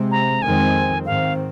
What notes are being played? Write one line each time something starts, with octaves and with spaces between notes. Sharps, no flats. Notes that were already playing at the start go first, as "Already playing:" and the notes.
Already playing: C3 G#3 C4
A#5
F2 D#3 G#3 C4 G#5
G#2 D#3 C4 F5